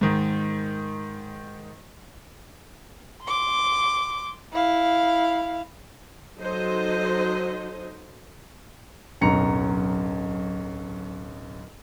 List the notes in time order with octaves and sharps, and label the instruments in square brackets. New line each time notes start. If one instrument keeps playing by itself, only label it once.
[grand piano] G#2 D#3
[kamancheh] C6 D6
E4 F5
[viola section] F#3 D#4 A4 C5 D#5
[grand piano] D1 B1 F#2 A#5 C#7